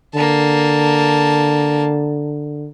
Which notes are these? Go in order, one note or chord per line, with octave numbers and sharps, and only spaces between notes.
D3 A#3 A5